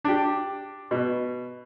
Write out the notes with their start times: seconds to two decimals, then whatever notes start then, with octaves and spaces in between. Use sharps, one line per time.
0.04 D4 G4
0.91 B2